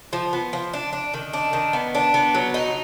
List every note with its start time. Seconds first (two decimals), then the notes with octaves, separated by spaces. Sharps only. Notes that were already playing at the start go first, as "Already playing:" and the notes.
0.13 F3
0.33 B3
0.53 F3
0.73 D4
0.93 D4
1.14 D#3
1.33 D4
1.53 D#3
1.73 B3
1.95 D4
2.14 B3
2.34 F#3
2.54 D#4